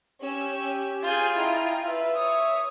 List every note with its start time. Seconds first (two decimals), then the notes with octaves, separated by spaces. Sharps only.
0.22 C#4 G4 E6
1.03 F4 G#4 G6 A6
1.36 E4 D#5 G5 A#5
1.85 B4 E5
2.16 C#5 D#6